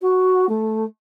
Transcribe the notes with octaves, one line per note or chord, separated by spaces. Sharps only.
F#4
A3